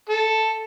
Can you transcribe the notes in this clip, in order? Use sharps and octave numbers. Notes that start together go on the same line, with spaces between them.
A4